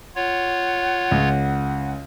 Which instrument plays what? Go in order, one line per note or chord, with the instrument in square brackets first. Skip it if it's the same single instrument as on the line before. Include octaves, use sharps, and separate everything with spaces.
[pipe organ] F4 C#5 [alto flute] F#5
[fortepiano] C#2